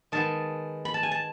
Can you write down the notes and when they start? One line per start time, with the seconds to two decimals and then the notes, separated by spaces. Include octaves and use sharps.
0.12 D#3 G#3 B3 A5
0.85 B5
0.94 A5
1.03 G#5
1.11 A5